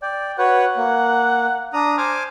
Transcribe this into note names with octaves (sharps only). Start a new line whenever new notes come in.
D5 G5
F#4 B4 C#5 F#5
A#3
D4 A#5 D#6
C5 G#5 D6 F6